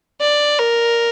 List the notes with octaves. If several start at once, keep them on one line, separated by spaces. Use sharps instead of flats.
D5
A#4